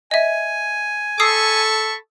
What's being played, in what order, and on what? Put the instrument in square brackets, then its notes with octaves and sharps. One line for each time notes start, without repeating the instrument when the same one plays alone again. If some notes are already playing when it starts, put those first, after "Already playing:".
[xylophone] D#5 E5 [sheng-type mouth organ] G#5
[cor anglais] A4 [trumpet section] A5 B5 C#6 [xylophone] D#6 E6 C7